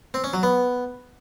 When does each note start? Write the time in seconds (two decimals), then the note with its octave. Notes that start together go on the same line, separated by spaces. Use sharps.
0.14 C4
0.24 C#4
0.33 F#3
0.43 B3